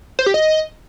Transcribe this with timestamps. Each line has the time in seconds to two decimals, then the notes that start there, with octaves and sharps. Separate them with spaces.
0.19 C5
0.26 G4
0.34 D#5